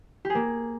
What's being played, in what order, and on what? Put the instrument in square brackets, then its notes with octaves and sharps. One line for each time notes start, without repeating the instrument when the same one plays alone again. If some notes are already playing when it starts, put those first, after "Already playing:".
[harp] G4
G#4
A#3